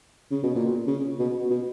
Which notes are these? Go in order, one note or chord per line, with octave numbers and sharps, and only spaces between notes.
C#3
B2
A#2
C#3
B2
B2